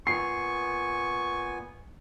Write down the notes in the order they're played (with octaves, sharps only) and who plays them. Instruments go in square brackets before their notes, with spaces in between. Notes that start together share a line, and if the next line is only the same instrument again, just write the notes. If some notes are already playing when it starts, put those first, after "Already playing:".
[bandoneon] A#2 B3 G#5 [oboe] C#6 [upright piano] C7